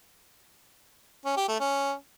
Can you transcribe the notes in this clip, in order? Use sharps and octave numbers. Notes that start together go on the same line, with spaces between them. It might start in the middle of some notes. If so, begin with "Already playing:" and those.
C#4
G4
A3
C#4